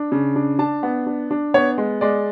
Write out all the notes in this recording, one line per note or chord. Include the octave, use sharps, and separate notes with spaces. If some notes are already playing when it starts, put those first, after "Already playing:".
Already playing: D4
C#3
D4
D4 A5
B3
D4
D4
B3 C#5
G#3
G#3 D5